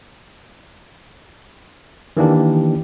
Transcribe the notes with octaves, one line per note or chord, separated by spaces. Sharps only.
D#3 E3 A#3 D4 G4